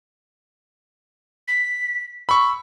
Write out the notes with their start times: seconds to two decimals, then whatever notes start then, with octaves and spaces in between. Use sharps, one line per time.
1.48 B6
2.29 B5 C#6 E6